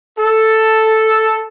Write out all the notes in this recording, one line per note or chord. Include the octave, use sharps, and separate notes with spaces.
A4